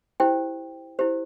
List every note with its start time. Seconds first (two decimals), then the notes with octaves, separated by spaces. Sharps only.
0.20 E4 G4 C5 G5
0.99 E4 G4 C5